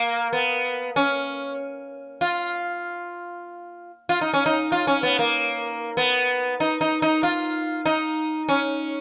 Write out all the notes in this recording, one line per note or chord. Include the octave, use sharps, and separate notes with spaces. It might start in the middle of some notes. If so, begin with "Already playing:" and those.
Already playing: A#3
B3
C#4
F4
F4
D#4
C#4
D#4
F4
C#4
B3
A#3
B3
D#4
D#4
D#4
F4
D#4
C#4